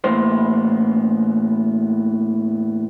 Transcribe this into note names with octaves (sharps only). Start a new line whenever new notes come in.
E2 A2 A#3 B3 C5